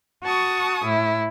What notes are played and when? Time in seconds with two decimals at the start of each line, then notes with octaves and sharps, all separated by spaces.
0.24 F#4 A5 C#6 D#6
0.84 A2 E4